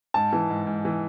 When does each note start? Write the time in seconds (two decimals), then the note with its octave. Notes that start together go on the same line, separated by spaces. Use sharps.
0.14 G#2 A5
0.33 E3
0.50 G#2
0.67 G#2
0.85 E3